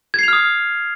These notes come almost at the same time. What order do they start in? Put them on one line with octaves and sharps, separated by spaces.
G#6 C7 F7 F6 D#6